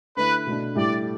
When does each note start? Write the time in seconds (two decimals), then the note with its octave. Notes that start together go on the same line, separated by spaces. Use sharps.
0.16 D3 A3 E4 B4
0.46 B2 A3 D4
0.76 A2 G3 E4 G4 D5